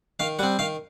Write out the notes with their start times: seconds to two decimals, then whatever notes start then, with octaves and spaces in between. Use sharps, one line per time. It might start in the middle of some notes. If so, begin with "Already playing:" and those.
0.19 D#3 F5
0.39 G3 C4 F#5
0.59 D#3 F5